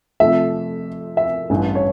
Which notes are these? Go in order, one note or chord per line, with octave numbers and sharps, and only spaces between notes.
F2 C3 F3 A3 E5
E5
A1 G2 E3
C#5